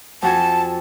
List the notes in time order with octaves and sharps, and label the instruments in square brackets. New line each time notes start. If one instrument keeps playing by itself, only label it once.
[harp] F2 F#4 G#5 [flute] A5